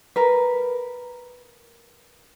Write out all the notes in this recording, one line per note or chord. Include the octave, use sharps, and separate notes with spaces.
A#4 B4